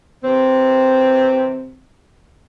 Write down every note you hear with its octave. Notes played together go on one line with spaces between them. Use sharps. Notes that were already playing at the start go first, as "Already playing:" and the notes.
C3 E3 C4